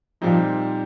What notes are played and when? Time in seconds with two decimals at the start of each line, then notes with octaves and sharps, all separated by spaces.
0.22 A#2 F3 G3 C4 D#4